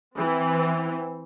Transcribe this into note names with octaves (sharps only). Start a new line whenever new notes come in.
E3 C4